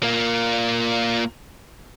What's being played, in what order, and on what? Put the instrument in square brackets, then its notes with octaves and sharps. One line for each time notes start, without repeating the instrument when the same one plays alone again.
[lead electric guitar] A#3 F4